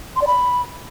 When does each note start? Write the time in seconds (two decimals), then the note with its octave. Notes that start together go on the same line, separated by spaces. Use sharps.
0.16 C6
0.22 D5
0.27 B5